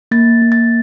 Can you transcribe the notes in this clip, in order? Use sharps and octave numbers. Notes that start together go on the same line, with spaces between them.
A#3 A6
A#3
A6